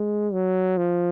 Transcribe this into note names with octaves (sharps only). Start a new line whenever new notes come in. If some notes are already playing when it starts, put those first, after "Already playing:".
Already playing: G#3
F#3
F3